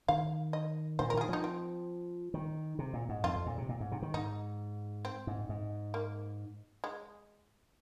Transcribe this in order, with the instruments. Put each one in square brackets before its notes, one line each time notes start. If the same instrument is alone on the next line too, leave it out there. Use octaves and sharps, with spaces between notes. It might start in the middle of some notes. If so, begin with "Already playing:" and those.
[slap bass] D#3 [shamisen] F5
[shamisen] D#5
[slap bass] A#2 [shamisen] C5
[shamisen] A#4
[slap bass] D#3 [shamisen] F4
[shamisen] G#4
[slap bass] F3 [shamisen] D#4
[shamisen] C4
[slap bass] D#3
C3
A#2
G#2
[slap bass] F2 [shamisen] F4
[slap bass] F2
A#2
C3
A#2
G#2
C3
D#3
[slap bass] G#2 [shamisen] D#4
[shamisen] C4
[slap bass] G#2
G#2
[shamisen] A#3
G#3